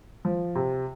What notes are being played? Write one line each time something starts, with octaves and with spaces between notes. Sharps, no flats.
F3
C3